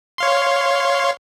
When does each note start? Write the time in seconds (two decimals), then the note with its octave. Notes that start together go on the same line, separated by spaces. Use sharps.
0.18 C#5 F5 C6